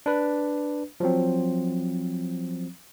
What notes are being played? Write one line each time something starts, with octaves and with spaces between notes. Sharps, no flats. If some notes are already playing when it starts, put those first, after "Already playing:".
D4 B4
F3 F#3 C4